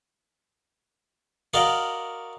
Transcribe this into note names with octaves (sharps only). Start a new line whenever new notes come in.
F#4 A#4 D5 D#5 F5